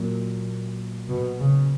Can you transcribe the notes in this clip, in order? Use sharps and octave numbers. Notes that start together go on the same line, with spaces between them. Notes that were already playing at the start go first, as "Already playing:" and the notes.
Already playing: A#2 F#3 A#3
B2
C#3